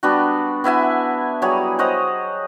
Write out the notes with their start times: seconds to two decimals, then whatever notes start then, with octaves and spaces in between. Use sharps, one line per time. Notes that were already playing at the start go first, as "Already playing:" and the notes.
0.03 G3 B3 D4 F#4
0.64 B3 E4 E5 G#5
1.42 F#3 G3 G#4 C#5
1.79 C5 C#5 D#5 F#5